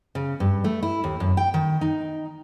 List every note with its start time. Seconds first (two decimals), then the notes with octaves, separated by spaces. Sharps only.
0.15 C#3
0.40 G2
0.64 A3
0.83 E4
1.04 D#2
1.20 F#2
1.37 G5
1.54 D#3
1.81 D#4